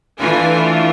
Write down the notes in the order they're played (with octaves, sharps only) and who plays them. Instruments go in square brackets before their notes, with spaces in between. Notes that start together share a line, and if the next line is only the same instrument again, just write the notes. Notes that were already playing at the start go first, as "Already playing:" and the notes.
[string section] E3 A3 D4 F4 G#5